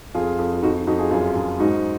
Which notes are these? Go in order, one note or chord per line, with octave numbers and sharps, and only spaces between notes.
F2 F4 G#4
F2
F4
F2 D#4 F#4
F2 D#4 F#4
F4 G#4
F#2 F4 G#4
F#2
G#2 D#4 F#4